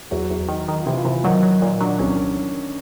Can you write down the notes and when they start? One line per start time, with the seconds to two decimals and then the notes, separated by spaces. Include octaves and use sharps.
0.11 E2 F#3 F#4
0.30 E2
0.48 D#3
0.68 D#3
0.80 F4
0.86 C3 E3 E4
0.97 F4
1.05 C3 E3 E4
1.24 D#3 F#3 D#4
1.43 F#3
1.62 A#2
1.81 F#3 D4
1.99 C2 C#4